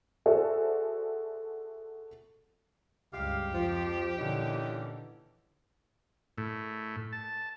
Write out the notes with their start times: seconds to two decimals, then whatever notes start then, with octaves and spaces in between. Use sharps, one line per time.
0.26 F#4 G#4 A4 C5 D5 E5
3.13 C#2 G2 G4 F5
3.53 F2 F3
4.18 A#2 D3 E3 C#4 D#4
6.38 A2
7.13 A5